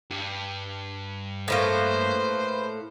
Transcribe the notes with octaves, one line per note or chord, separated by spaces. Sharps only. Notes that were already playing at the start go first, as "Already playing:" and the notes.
G2
A2 A3 A#3 B4 C5